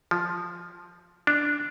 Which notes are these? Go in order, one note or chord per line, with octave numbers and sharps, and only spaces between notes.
F3
D4